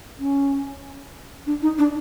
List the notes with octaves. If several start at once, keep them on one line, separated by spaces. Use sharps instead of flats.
C#4
D4
D#4
D4